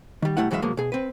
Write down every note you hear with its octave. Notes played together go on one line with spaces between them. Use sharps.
D#3 G3
B1 D#3 G3 A3 E4 F#5
F#2 E3 F#3 G#3 E5 F5
B2 F3 F#3 G#3 A#3
B2 G#4
C4 B4